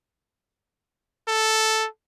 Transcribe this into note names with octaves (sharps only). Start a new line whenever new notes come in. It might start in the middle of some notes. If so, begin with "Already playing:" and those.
A4